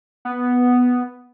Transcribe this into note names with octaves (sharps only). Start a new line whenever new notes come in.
B3